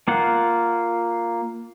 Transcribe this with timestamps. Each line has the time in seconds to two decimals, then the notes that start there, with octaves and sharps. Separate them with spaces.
0.08 A#3 F4 F#5